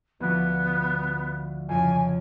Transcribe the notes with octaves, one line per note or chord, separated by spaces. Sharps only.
D2 F3 B3
F2 C#3 F3 G#5